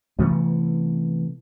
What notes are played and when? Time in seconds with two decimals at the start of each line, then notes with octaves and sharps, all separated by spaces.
0.19 C3 E3 A3 B3